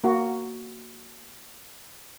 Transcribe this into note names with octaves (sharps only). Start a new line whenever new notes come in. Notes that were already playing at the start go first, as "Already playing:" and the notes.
A#3 F#4